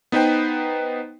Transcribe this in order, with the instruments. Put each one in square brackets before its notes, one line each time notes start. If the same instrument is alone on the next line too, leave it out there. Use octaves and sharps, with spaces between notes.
[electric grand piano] B3 D#4 B4 C5 G5